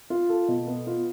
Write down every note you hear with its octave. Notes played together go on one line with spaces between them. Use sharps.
F4
A4
B2
B3
F4